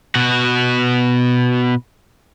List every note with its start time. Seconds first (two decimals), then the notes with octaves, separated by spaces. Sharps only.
0.15 B2 F#4